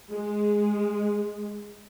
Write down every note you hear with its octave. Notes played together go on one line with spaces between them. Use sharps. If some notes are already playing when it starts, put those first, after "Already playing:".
G#3 G#4